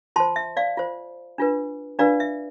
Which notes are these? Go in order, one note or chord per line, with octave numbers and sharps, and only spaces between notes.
F4 C5 A5 C6
E5
D5 F5
F4 C5
D4 F4 B4
D4 F4 B4 D5 F5
E5